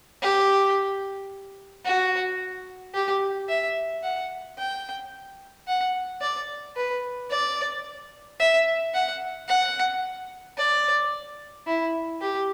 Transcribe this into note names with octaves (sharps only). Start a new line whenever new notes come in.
G4
F#4
G4
E5
F#5
G5
F#5
D5
B4
D5
E5
F#5
F#5
D5
E4
G4